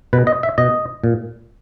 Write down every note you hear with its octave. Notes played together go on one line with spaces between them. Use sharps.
B2 B4
D#5
E5
B2 D#5
A#2